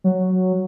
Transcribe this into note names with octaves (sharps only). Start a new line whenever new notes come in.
F#3